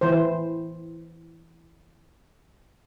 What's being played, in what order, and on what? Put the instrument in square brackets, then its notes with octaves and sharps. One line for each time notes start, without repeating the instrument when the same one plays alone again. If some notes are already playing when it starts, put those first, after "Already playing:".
[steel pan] E3 C5